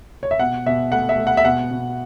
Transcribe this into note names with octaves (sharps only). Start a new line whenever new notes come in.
C#5
E5
B2 F#5
B2 E5
A3 F#5
E5
A3
F#5
E5
B2 F#5
B2